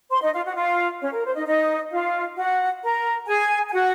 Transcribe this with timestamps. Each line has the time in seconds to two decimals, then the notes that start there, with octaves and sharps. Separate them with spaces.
0.11 C5 C6
0.22 D#4 D#5
0.34 F4 F5
0.45 F#4 F#5
0.56 F4 F5
1.01 C#4 C#5
1.13 A#4
1.25 C5
1.35 D#4 D#5
1.46 D#4 D#5
1.92 F4 F5
2.37 F#4 F#5
2.82 A#4 A#5
3.28 G#4 G#5
3.69 G#5
3.73 F#4 F#5